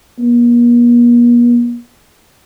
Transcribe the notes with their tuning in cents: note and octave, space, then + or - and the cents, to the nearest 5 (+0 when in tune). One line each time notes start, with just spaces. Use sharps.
A#3 +45